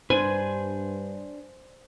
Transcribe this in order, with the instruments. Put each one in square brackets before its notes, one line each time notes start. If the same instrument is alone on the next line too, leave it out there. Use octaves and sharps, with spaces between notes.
[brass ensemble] G2 [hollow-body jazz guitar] D4 B4 [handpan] C5 [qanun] G#5